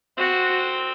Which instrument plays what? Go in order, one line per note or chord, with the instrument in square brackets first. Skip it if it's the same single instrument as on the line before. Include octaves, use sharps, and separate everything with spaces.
[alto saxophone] C4 [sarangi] F#4